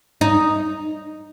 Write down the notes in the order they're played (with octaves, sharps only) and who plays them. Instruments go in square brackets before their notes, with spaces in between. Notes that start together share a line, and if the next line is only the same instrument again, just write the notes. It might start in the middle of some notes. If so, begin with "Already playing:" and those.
[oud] D#4